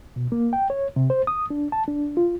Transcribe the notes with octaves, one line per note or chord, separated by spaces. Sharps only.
B2
A#3
G5
C#5
C3
C5
D#6
D4
A5
D4
F4